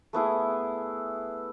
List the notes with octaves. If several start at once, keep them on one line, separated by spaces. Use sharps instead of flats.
A3 B3 E4 G#4